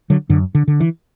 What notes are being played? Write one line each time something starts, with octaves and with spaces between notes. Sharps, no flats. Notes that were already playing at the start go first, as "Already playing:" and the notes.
D3 F#3
F#2 D3
D3
D3
E3